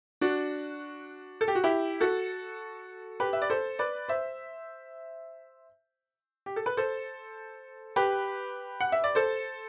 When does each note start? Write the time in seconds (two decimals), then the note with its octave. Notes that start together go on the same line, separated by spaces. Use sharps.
0.21 D4 F#4
1.41 A4
1.48 G4
1.55 F#4
1.64 E4 G4
2.01 F#4 A4
3.20 G4 B4
3.33 E5
3.42 D5
3.50 A4 C5
3.79 B4 D5
4.08 C5 E5
6.46 G4
6.56 A4
6.66 B4
6.77 A4 C5
7.96 G4 B4
8.80 F#5
8.92 E5
9.04 D5
9.15 A4 C5